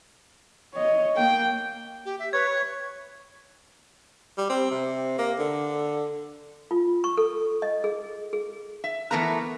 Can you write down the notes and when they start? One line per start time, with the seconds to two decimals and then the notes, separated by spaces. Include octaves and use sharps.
0.74 C#5 D#5
1.16 A#3 G5
2.06 G4
2.19 E5
2.33 B4 C#5 G#6
2.50 C#6
4.38 G3
4.49 C4
4.71 C3
5.18 A#3
5.39 D3
6.71 F4
7.04 C#6
7.17 A4
7.62 D#5
7.84 G#4
8.33 G#4
8.84 E5
9.11 E3 A3 B3 A#4 A#5